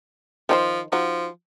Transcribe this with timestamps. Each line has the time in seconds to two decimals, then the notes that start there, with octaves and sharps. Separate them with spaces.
0.49 D#3 F3 D#4 C5
0.92 F3 D#4 F#4